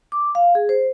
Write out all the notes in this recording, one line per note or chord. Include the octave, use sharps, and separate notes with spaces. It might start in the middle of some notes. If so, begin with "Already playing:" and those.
D6
F5
G#4
C5